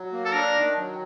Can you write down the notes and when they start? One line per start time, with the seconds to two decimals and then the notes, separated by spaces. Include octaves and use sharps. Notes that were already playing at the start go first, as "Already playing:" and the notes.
Already playing: F#3
0.13 A#3
0.25 A4
0.33 D4 A#4
0.55 D#3
0.77 F#3